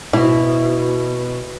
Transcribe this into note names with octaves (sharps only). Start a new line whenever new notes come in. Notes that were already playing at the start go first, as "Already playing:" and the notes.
B2 E4